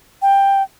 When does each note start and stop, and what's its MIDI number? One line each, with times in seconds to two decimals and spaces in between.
0.22 0.62 79